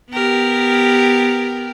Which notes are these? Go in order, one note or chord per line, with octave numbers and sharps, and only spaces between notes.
B3 G4 A#4